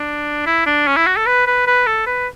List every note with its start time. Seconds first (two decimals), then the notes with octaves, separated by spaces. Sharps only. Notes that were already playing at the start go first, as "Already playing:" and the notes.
Already playing: D4
0.46 E4
0.66 D4
0.87 C#4
0.96 E4
1.06 F#4
1.16 A4
1.26 B4
1.47 B4
1.67 B4
1.86 A4
2.06 B4